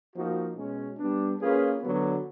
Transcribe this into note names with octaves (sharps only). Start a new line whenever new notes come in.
F3 A#3 D#4 F#4
B2 G#3 C#4
G3 B3 D4
A#3 C#4 F4 G#4 B4
D3 F#3 B3